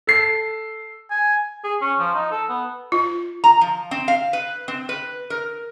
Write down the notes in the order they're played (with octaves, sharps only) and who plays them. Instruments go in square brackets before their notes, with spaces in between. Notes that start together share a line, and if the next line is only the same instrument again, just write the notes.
[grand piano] A4 C7
[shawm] G#5
[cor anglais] G#4
C#4
F3
D#4
A4
B3
[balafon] F4
[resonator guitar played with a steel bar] A#5
F3
C4
F5
B4
C4
B4
A#4